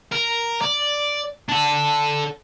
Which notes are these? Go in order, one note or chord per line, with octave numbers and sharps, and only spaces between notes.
A#4
D5
D4 A4